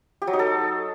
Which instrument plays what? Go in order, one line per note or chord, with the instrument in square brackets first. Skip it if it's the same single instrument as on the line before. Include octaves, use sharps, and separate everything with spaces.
[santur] G4
F#3
D#4
A4